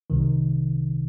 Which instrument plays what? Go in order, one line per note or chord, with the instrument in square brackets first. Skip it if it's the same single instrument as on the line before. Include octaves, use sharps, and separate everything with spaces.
[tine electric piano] C2 C3 D#3